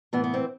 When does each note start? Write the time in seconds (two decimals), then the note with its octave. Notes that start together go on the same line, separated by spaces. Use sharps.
0.13 A2 E3 B3
0.24 B3
0.34 C4